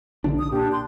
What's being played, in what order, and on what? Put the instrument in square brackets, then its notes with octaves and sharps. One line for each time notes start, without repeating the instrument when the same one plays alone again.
[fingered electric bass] B1 D3 D4
[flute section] D#6
[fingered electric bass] A#2 [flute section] D4 G4
[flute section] C6